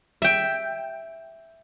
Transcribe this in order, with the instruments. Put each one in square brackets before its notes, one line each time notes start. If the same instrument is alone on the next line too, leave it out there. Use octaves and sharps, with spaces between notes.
[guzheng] E5 G5